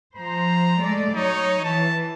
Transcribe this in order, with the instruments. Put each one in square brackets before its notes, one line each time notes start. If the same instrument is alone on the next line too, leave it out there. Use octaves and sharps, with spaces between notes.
[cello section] F3 C5 [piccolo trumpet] A#5
[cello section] G#3 A3 D5
[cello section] F#3 C#5 [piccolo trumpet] D#4
[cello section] E3 [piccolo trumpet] A5